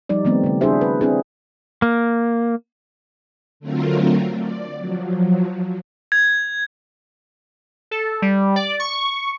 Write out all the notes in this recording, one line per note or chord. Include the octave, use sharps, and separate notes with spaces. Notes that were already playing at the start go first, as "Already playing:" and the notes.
F3 G3 D#4 D5
D#3 F3 G3 A3 B3 C4
C#3 G3
D4 E4 F#4 G#4 C5 E5
B4
C4 D4 E4 G#4
A#3
D3 F#3 A3 C4 F4 A#4
D5
F3 F#3
G#6
A4
G3
D5
C#6